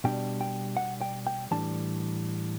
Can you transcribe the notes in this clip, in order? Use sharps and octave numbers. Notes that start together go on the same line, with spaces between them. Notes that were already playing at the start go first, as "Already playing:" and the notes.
B2 G3 D4 G5
G5
F#5
G5
G5
A2 E3 G3 D4 A5